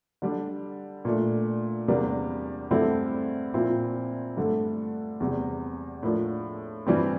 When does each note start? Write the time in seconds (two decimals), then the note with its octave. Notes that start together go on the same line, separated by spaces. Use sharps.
0.22 D3 G3 D4
1.05 A#2 A3 D4
1.88 E2 C3 G3 A#3 D4
2.71 G2 D3 A3 C4 E4
3.54 A#2 F3 C4 E4
4.37 G2 D3 A3
5.20 E2 C3 G3
6.03 A2 F3 A#3 D4
6.87 G2 E3 G3 C4